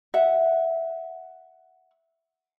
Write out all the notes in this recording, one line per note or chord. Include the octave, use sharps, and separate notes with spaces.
E5 F#5